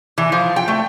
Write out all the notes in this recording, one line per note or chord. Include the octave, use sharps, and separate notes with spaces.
E3
F3
G5
A3